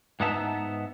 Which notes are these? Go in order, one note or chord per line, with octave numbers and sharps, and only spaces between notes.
G#2 B3 D#4 E5 A5